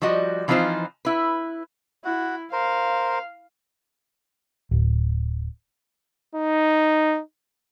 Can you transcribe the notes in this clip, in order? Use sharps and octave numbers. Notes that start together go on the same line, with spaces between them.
F3 G3 F#4 D#5
E3 F3 C4 D#4 F4 C5
E4 B4
E4 F#4
A#4 C5 F5
D1
D#4